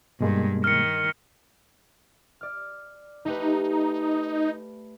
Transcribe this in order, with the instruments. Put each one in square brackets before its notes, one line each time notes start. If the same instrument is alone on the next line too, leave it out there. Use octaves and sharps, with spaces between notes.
[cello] G2 [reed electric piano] B2 G#3 A#3
[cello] D#3 [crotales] F6 C#7
[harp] D5 F6
[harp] A3 G4 B4 [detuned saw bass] D#4